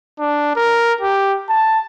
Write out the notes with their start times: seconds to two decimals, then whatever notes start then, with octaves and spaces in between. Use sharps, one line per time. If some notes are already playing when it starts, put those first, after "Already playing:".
0.20 D4
0.56 A#4
1.02 G4
1.49 A5